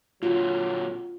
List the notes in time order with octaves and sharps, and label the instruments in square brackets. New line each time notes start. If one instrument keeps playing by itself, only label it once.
[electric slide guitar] A#2 D3 [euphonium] F#3 [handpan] F4